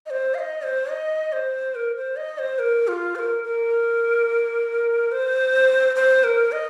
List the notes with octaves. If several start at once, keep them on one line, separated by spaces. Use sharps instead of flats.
D#5
C5
F5
D#5
C5
D#5
C5
A#4
C5
D#5
C5
A#4
F4
C5
A#4
A#4
C5
C5
A#4
D#5